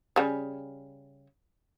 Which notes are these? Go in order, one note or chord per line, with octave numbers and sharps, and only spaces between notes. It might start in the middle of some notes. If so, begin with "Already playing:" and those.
C#3 G3